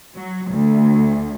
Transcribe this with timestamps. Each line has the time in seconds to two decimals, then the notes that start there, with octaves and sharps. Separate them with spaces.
0.15 F#3
0.52 D2